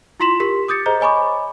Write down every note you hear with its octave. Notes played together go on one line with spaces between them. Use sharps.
E4 F4 C6 B6 E7 F#7
G4 A#4 B6
D6 D#6 G6 A6 C#7
G#4 C5 D#5 A#5 G6 G7
C#5 D#5 G#5 B5 C#6 D6